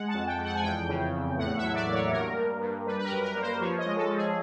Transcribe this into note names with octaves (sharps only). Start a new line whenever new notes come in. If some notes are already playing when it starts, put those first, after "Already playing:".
Already playing: G#3 F#5
A5
F2
G5
F2
F#5
G#5
E2 G5
C#3
E2
A2 F#5
E5
F#3
D5
A#3
C#5
G2 A#4
G2
G2
G3 B4
B4
A#4
F#2
A#4
A#3
C5
F3 C#5
D#5
G#3
A4
F3
G#4